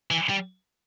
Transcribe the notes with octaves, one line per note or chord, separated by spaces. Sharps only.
E3
G3